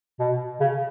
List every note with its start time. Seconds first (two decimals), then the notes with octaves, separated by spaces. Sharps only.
0.20 B2
0.60 C#3